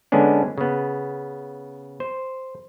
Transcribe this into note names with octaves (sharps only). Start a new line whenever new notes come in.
D3 G#3 B3 C#4 D4
C#3 B3
C5